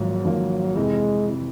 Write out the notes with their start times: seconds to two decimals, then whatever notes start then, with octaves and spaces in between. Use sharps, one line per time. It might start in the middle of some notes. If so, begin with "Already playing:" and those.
Already playing: G#1 G#2 F3 F#3 A#3
0.25 G#1 G#2 F3 A#3
0.76 F2 C3 E3 G#3
1.28 C3 E3